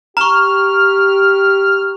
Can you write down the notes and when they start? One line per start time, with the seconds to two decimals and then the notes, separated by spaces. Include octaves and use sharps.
0.17 G4 A#5 C#6 F6